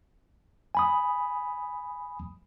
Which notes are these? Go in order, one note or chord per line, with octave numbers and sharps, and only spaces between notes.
G#5 B5 D#6